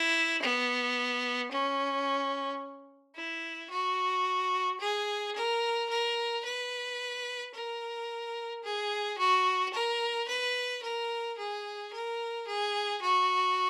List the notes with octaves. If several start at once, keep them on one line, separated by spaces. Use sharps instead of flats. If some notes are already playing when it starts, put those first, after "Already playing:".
Already playing: E4
B3
C#4
E4
F#4
G#4
A#4
A#4
B4
A#4
G#4
F#4
A#4
B4
A#4
G#4
A#4
G#4
F#4